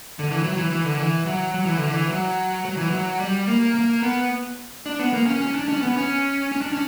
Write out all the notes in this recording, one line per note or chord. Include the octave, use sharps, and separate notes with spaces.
D3
E3
F#3
E3
E3
D3
E3
F#3
F#3
E3
D3
E3
F#3
F#3
E3
F#3
G3
A#3
A#3
B3
D4
B3
A#3
C#4
C#4
D4
C#4
B3
C#4
C#4
D4
C#4